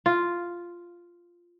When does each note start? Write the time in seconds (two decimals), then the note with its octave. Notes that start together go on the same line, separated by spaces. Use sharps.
0.06 F4